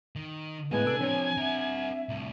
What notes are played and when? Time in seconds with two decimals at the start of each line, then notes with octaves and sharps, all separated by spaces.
0.16 D#3
0.71 A2 G#3 A#3 B3 B4 D#5 G#5
0.86 C3 D4 A4 E6
1.01 F3 C4 D4 A#4 C#5
1.38 A#4 E5 F#5
2.09 C2 A2